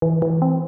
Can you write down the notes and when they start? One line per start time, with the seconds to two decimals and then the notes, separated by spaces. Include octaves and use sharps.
0.02 E3
0.22 E3
0.42 C4